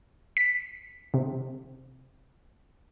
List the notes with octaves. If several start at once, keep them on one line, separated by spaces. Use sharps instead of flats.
B6
C3